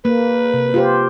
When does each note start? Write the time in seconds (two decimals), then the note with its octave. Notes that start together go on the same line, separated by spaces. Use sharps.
0.05 A#3 B4
0.54 C3
0.74 F4 G4 C5